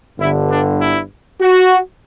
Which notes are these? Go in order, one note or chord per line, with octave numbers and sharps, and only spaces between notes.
G1 G2 D3 E4
D4
E4
F#4